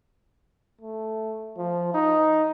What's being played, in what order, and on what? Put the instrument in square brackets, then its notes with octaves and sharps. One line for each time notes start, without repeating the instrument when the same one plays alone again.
[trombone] A3
F3
D#4